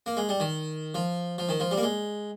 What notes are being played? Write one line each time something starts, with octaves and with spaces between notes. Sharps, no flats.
A#3
G#3
G3
D#3
F3
F3
D#3
F3
G3
A#3
G#3